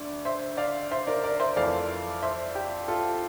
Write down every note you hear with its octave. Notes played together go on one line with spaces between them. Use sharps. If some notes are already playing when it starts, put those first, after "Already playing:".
Already playing: D2 D3 D5
C5 E5
D5 F5
C5 E5
A#4 D5
A#4 D5
C5 E5
F2 E3 A3 D5 F5
C5 E5
G4
F4 A4